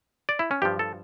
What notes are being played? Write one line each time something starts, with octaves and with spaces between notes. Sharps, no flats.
D5
E4
C#4
G2 F3 G4
A4